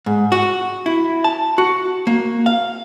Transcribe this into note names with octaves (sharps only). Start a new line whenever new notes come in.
G#2
F#4
E4
A5
F#4
A#3
F5